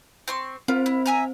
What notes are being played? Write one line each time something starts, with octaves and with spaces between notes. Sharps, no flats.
C4 C6 C#6
C4 F4 C5
E4
E5 G#5 A#5